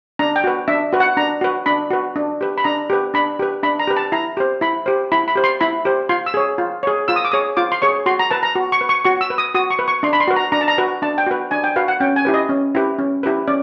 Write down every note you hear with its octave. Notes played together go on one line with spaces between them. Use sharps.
D4 A#5
G5
F#4 B4
D4 E5
F#4 B4
F#5
D4 A#5
F#4 B4
D4 B5
F#4 B4
D4
G4 B4
B5
D4 A#5
G4 B4
D4 B5
G4 B4
D4 B5
A#5
G4 B4
A5
E4 A#5
G4 C5
E4 B5
G4 C5
E4 B5
B5
G4 C5
C6
E4 B5
G4 C5
F4 C6
E6
G#4 C#5
F4
G#4 C#5
F4 E6
D#6
D6
G#4 C#5 D#6
F4 D6
C6
G#4 C#5 C#6
F#4 C6
A#5
B4 A5
A#5
F#4
C#6
B4
C#6
F#4 C#6
E6
B4
D#6
F#4 D#6
C#6
B4
C#6
D4 C6
B5
C6
F#4 B4
A#5
D4 A#5
A5
A#5
F#4 B4
D4 A5
G5
F#4 B4
D4 G#5
G5
F#4 B4 F5
F#5
C#4 G5
G#5
E4 G4 B4
D#5
C#4
E4 G4 B4
C#4
E4 G4 B4
C#4 D5